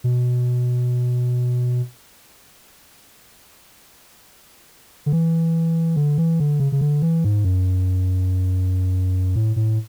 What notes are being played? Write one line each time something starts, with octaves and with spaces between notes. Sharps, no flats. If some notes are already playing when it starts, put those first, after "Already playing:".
B2
D3
E3
D3
E3
D3
C#3
C#3
D3
E3
G#2
F#2
A2
A2